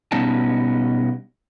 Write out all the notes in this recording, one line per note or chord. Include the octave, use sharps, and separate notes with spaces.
B2 G3 B3 C#4 D#4 A5